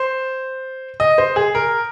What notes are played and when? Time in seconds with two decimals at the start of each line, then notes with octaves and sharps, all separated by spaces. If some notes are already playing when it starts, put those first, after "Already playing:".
Already playing: C5
1.00 D#5
1.18 C5
1.36 G#4
1.55 A#4